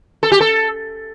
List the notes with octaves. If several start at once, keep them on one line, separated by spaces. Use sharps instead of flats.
A4
G4
A4